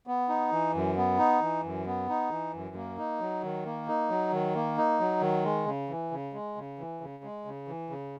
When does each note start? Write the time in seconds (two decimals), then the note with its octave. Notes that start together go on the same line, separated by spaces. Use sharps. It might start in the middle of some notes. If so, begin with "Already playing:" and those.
0.07 B3
0.29 D#4
0.52 E3
0.75 F#2
0.97 B3
1.18 D#4
1.42 E3
1.64 F#2
1.87 B3
2.09 D#4
2.31 E3
2.54 F#2
2.76 A#3
2.98 D#4
3.20 F#3
3.43 D#3
3.66 A#3
3.88 D#4
4.10 F#3
4.33 D#3
4.55 A#3
4.78 D#4
5.00 F#3
5.21 D#3
5.44 G#3
5.66 C#3
5.89 E3
6.11 C#3
6.33 G#3
6.56 C#3
6.79 E3
7.01 C#3
7.24 G#3
7.45 C#3
7.68 E3
7.90 C#3